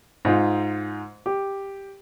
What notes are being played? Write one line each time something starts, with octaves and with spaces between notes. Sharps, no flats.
G#2 D#4 F4
G4